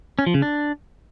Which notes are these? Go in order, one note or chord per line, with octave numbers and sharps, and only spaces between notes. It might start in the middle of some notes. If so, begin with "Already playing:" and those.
C#4
F3
C#3
D4